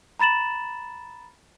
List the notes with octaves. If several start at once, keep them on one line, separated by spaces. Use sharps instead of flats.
A#5 B5 A6 E7 F#7